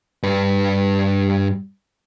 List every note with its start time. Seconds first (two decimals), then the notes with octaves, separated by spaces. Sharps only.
0.23 G2 B4